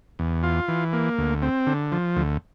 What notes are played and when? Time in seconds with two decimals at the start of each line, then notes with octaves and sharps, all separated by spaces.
0.19 E2
0.43 F4
0.68 E3
0.93 A#3
1.18 D2
1.43 C4
1.67 D3
1.92 F3
2.17 D2